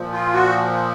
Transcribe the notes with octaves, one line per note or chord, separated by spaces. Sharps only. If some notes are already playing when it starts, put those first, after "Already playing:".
Already playing: A#2 F3
F4
F#4